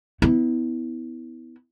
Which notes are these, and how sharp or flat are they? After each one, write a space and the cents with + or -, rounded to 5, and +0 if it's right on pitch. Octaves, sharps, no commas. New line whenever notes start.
B3 +20 E4 -25